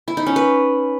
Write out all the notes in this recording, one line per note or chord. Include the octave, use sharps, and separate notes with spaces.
E4
D#4
C#4
B4